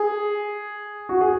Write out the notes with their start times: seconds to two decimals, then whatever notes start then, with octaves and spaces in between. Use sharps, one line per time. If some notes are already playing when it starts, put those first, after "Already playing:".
Already playing: G#4
1.09 F#4
1.21 G#4